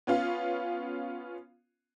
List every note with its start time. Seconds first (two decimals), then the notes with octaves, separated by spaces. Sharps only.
0.07 B3 C#4 F4 F5